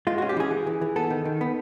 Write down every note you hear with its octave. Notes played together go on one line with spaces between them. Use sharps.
G#3 F4
C#4 F#4
G4
E3 G#4
E3
E3
E3
B3 A4
D#3
D#3
B3